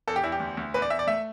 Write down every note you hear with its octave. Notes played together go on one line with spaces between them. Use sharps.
E2 A4
G4
E2 E4
G4
D2
D2
E2 B4
D5
E2 E5
D5
A3 E5